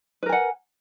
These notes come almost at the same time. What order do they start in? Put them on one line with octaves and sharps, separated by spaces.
B4 A#4 G#5 F#5